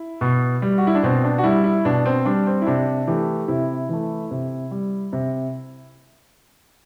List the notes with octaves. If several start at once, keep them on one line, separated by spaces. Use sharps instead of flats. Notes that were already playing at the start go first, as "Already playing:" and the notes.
Already playing: E4
B2
G3
F#4
E4
D4
B2 C4
D4
F#4
G3 E4
E4
B2 D4
C4
G3 D4
C4
E4
C3 D4
E3 A3 G4
C3 E4
E3 A3
C3
G3
C3